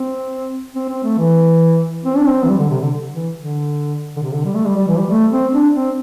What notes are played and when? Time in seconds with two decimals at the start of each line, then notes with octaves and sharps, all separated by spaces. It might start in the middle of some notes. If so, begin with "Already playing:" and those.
Already playing: C4
0.75 C4
0.89 C4
1.04 A3
1.18 E3
2.05 C4
2.17 D4
2.27 C4
2.44 E3
2.49 G3
2.59 D3
2.70 C3
2.82 D3
3.13 E3
3.36 D3
4.16 D3
4.22 C3
4.33 D3
4.44 G3
4.55 A3
4.66 G3
4.77 G3
4.88 E3
4.99 G3
5.10 A3
5.32 C4
5.53 D4
5.75 C4